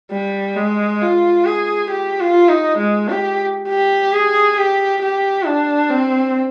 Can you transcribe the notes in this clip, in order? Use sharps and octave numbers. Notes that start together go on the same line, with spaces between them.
G3
G#3
F4
G#4
G4
F4
D#4
G#3
G4
G4
G#4
G4
G4
D4
C4